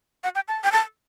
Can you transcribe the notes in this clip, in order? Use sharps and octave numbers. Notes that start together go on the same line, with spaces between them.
F#5
G5
A5
G5
A5